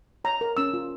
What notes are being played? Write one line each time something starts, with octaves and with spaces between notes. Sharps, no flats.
C#5 A#5
A#4
C#4 E6
F4